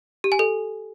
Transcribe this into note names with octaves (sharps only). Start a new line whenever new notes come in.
G4
G#5
A4